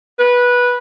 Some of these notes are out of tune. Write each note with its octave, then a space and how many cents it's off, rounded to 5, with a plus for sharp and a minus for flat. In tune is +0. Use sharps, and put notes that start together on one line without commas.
B4 -15